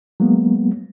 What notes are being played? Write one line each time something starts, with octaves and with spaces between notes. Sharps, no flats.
F#3 G#3 A#3 B3